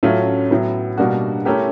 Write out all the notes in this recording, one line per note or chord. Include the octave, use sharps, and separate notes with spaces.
A2 F#3 A3 C#4 F4
A2 F#3 B3
B2 G3 A#3 D4 F#4
A3 C#4 E4 G4 A#4